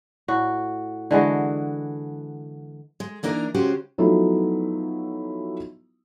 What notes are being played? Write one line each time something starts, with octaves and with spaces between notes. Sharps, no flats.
A2 F#4
D3 E3 G#3 F#4
G#3
E3 A#3 D4 D#4 A#4
C#3 G#3 C#4 F#4 G4 C5
F3 F#3 A3 B3 D#4 E4